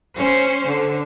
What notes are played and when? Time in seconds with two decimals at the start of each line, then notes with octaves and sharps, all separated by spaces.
0.15 C#4 C5
0.67 D3